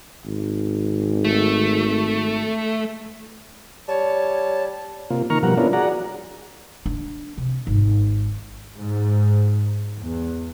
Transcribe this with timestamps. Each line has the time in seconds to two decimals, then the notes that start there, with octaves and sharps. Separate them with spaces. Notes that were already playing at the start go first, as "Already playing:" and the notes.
0.25 G#1
1.25 A3
3.88 G3 C#5 A5
5.10 C3 A#3 F4
5.30 D#3 A#3 A#5 C#6 F6
5.43 B2 F3 G3 A#4 F#5
5.57 B3 C#4 D4 E4 F4 A#4
5.73 F#4 G#4 D5 F#5 A#5
6.86 D4
7.38 C3
7.67 G#1
8.77 G#2
9.97 E2